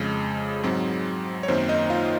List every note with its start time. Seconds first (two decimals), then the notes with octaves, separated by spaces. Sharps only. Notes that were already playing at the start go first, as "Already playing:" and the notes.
Already playing: F2 C#3 G#3 G#4
0.64 G#2 F#3 C4
1.43 C#5
1.48 F#2 D#3 A#3 C4 C5
1.69 D#4 D#5
1.90 F4 F5